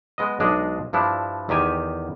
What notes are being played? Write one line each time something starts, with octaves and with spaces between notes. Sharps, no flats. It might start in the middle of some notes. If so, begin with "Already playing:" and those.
G#3 B3 D#5
B1 G#3 D4 G#4 D#5
G2 F3 D4 E4
E2 D#3 G4 G#5